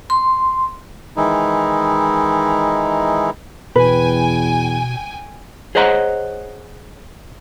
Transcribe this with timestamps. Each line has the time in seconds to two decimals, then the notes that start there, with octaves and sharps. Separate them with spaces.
0.10 C6
1.17 D#3 E3 G#3 D#4 E4
3.76 E2 B2 B4 G5 G#5
5.75 G#4 C5 C#5 D#5 F#5 A#5